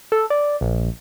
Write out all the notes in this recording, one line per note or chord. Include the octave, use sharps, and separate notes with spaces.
A4
D5
A#1